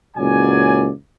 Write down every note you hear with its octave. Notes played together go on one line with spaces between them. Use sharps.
F#1 C#2 A#2 F#3 D5 G#5